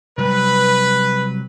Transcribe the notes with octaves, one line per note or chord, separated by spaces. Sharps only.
C3 F#3 G3 B4